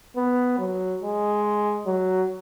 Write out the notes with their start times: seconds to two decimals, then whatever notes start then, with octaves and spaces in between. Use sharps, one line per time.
0.16 B3
0.58 F#3
1.02 G#3
1.86 F#3